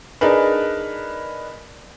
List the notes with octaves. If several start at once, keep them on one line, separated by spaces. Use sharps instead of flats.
D4 D#4 G#4 A#4 B4